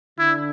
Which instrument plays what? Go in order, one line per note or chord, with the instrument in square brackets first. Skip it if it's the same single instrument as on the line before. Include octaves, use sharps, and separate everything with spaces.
[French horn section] D3 [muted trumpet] E4